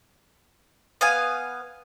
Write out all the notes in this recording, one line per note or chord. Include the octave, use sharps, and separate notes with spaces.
B3 F5 G#5